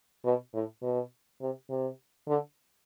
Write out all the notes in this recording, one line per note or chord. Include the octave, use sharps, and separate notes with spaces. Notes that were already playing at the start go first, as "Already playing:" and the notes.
B2
A2
B2
C3
C3
D3